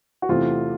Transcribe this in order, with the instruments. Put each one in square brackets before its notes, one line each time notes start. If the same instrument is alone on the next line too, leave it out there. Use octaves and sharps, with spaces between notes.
[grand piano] F#4
[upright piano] E2 C3 E3 A3 C4 [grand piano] F4